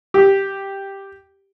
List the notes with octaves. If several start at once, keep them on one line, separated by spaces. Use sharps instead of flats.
G4